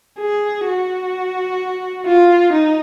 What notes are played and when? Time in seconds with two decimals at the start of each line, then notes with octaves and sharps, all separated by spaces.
0.20 G#4
0.66 F#4
2.06 F4
2.53 D#4